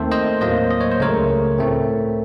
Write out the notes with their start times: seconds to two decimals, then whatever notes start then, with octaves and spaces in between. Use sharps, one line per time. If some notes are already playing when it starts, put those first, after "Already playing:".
Already playing: D#2 D#3 A3 C4 A4 C5
0.12 C5 D#5
0.41 A2 F#3 A#3 C5 D#5
0.71 D#5
0.81 C#5
0.92 C5
1.00 C#2 C#3 A3 A#4 C#5
1.59 A2 A3 C4